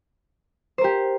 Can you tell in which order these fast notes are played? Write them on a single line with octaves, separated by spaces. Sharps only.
C5 A#4 G4